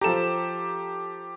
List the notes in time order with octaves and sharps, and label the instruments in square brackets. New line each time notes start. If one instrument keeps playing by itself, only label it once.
[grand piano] F3 A4 A#5 [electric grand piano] G4 E7